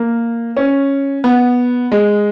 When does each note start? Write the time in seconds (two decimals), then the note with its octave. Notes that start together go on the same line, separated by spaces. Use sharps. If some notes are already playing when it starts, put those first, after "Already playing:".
Already playing: A#3
0.57 C#4
1.24 B3
1.92 G#3